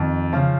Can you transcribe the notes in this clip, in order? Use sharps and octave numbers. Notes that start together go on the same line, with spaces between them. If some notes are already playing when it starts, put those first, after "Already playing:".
Already playing: F2 D#3
C#3 F3